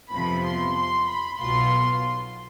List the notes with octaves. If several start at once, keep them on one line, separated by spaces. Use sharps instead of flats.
F2 C3 F3 B3 B5
C6
C6
B5
B1 B2 B3 F4 C6